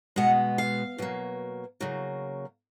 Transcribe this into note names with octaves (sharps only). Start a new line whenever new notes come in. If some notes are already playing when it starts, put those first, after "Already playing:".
B2 G#3 B3 F#5
F5
B2 F#3 A#3
C#3 F#3 A#3